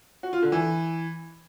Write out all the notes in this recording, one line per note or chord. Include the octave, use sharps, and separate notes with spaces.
F#4
F4
D3
E3